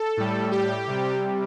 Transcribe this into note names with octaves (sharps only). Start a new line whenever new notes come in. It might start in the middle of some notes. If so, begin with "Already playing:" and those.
Already playing: A4
A2 G3
G4
C3 G3